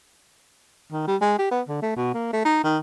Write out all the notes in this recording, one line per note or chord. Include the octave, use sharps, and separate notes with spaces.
D#3
G3
G#3
G4
B3
D3
A3
B2
A#3
A3
D#4
D#3